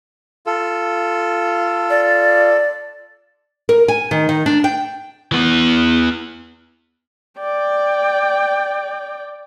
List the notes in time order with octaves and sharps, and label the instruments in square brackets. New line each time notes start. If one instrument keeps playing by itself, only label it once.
[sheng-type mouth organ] F4 [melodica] A4
[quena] D5
[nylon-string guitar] A#4
G#5
D#3
D#3
D4
G5
[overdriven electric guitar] E3 B3
[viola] D5 G5